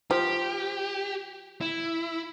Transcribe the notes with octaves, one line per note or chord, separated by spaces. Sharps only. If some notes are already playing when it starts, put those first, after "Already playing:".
F3 G4
E4